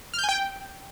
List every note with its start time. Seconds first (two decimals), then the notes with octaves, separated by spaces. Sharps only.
0.14 F6
0.19 G6
0.24 G#5
0.29 G5